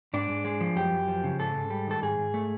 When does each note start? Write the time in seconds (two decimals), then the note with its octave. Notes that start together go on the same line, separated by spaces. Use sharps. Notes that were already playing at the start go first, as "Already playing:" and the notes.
0.14 G#2 D4
0.29 G#2
0.44 G#3
0.61 F3
0.76 F#2 G4
0.92 F#2
1.08 F3
1.24 C#3
1.39 G#2 A4
1.55 G#2
1.70 G3
1.87 D#3 A4
2.02 G#2 G#4
2.19 G#2
2.34 A3